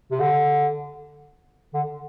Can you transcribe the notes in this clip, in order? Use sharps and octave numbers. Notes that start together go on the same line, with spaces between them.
C3
D3
D3